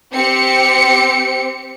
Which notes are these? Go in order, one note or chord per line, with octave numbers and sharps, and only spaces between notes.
C4 G4 C#7